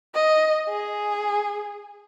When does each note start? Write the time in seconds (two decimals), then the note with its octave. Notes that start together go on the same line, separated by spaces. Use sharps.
0.14 D#5
0.69 G#4